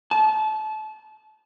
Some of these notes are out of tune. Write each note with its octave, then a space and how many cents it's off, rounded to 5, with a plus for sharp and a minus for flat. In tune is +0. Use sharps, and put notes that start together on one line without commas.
A5 -30